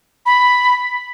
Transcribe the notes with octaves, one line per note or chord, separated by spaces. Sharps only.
B5